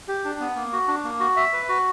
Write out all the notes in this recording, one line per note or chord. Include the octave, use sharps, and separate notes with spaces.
G4
D4
B3
A#3
F#4
D4
A#3
F#4
E5
B4
F#4